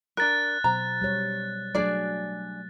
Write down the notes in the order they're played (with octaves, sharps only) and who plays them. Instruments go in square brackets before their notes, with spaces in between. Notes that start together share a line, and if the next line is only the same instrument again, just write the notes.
[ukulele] D4 A#4 [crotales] F#6 A6
[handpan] B2 F#3 C5 [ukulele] A#5
[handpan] G3 C#5
[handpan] F#3 A3 [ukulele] D4 G#4 D5